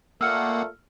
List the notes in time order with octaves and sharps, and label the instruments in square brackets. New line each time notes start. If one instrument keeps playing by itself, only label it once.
[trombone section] A#2 A3 [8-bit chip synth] A#3 F#5 [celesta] E6 F6 C#7